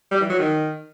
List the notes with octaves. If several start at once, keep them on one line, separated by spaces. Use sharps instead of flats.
G3
E3
F#3
D#3